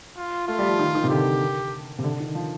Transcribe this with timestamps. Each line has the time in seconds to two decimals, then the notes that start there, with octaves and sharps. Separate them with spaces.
0.17 F4
0.48 A3 F4
0.58 G3
0.69 F3
0.79 D#3
0.95 D#3
1.04 C3
1.10 D3 G4
1.99 C3
2.04 D3
2.20 D#3
2.35 F3